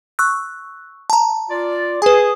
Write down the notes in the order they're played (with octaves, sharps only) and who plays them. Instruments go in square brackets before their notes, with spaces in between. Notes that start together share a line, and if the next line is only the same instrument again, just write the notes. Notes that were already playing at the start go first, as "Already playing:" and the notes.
[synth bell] C#6 E6 F#6
A5 A#5
[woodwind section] F4 D5
[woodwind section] G#4 [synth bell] B4 G#5